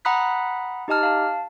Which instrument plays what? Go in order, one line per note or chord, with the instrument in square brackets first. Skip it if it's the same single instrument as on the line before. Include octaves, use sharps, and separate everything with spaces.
[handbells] F#5 A#5 B5 D#6 F#6 B6
D#4 G4 D#5 A5 F6
F5 A5